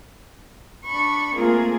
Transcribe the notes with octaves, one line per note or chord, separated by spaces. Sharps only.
D4 B5 C#6
A3 A#3 C4 F4 G#4 A#4